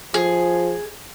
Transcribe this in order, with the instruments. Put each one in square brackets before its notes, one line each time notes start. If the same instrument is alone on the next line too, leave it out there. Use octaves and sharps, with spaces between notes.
[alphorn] F3 [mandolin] G#4